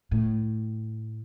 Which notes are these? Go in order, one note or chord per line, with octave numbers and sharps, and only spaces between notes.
A2